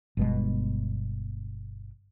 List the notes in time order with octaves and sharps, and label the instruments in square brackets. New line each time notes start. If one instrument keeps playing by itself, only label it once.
[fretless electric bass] G1 B2 G#3